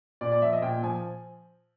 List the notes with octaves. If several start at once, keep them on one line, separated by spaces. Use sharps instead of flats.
A#2 D5
D5
F3 E5
D#5
A#2 G5
F3 G#5